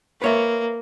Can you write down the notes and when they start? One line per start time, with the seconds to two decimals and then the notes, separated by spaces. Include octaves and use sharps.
0.22 A#3 B4 C#5 E5